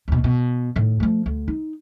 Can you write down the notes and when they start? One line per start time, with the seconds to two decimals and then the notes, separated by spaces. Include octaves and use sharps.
0.08 D#2 B2
0.24 B2
0.76 A2 D#3
1.00 F3 A3
1.26 D2
1.48 D#4